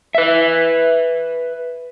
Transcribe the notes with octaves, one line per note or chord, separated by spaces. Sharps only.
B4 E5